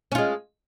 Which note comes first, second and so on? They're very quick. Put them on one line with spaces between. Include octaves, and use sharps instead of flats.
C#4 F4 G#3